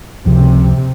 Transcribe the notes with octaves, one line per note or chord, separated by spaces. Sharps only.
G1 C#2 C3 F3